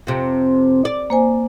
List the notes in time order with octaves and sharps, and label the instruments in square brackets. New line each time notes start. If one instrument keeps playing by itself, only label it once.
[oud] F2 C3
D5
[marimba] A#3 C5 G#5